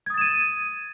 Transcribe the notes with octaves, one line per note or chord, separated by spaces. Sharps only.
D#6 G#6 A6 D#7 E7